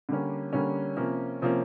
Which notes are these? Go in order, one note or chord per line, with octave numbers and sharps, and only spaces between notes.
D3 G3 A#3 C#4
D3 G3 A#3 C#4
C3 F3 A#3 C#4
C3 F3 A#3 C#4